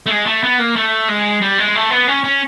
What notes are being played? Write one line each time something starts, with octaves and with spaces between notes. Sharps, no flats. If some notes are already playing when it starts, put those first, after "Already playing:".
A3
G#3
A3
B3
A#3
A3
G#3
G3
G#3
A3
B3
C#4
C#4